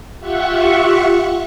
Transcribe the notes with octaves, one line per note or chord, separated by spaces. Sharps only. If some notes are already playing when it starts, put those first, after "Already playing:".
F4 G4 E5 F#5 C#6